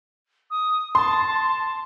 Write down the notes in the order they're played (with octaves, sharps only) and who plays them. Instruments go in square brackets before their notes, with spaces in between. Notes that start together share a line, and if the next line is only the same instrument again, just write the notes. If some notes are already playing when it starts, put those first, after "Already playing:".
[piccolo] D#6
[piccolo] A5 [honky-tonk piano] C6